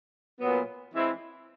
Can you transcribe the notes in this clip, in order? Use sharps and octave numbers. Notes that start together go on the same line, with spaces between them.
A#2 F#3 B3
E3 G#3 C4 E4